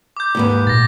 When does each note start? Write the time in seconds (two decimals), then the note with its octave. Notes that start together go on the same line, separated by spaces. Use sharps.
0.17 D6 G6
0.35 D#2 G#2 B4
0.67 A#2 A6 A#6